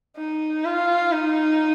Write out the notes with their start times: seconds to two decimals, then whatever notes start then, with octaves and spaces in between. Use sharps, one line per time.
0.17 D#4
0.65 F4
1.12 D#4